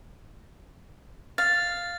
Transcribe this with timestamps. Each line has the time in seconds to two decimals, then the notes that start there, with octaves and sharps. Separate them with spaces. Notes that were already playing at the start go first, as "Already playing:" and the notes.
1.38 F5 A6